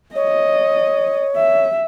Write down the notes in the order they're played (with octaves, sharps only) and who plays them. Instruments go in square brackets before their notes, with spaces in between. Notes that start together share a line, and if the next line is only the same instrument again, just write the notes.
[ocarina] C#5 [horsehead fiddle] D#5
[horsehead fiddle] E5